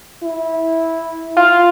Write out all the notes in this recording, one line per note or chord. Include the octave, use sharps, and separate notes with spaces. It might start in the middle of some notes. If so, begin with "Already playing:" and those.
E4
F4